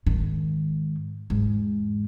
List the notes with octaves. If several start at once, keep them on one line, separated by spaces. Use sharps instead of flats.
G#2 D#3
E2 G#2